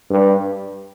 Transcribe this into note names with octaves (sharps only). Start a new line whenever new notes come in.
G2